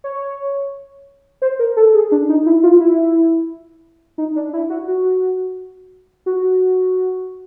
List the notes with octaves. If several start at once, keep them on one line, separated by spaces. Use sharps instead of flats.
C#5
C5
A#4
A4
G#4
D4
D#4
E4
F4
E4
D#4
D4
E4
F#4
F#4
F#4